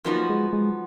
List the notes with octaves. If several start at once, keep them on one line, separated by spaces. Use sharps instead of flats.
F#2 F3 A#3 B3 D#4 F#4
G#3
G#3